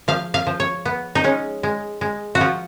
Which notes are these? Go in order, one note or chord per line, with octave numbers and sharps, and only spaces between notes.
F3 F5
F5
F3
C#5
B3
D#4
G#3 C#4
G#3
G#3
F#4
F3 F4